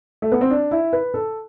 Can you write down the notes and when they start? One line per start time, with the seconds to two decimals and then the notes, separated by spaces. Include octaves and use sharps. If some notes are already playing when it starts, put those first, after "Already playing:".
0.22 A3
0.32 B3
0.41 C4
0.51 D4
0.71 E4
0.93 B4
1.14 A4